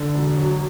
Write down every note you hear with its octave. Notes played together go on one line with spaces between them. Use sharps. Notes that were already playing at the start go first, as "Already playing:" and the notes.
Already playing: D3
E1
F#3